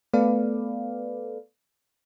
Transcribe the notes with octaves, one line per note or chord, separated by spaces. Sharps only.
A3 B3 A4 B4 D5 F5